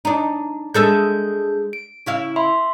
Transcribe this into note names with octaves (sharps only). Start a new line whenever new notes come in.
D4 D#4
G#3 D4 G#4 A4 E5 G6
D7
C#3 E4 F5
E5 B5 C6